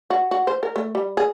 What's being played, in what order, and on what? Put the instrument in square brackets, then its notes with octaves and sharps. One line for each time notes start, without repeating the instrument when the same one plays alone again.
[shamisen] F#4
F#4
C5
A#4
A3
G3
G#4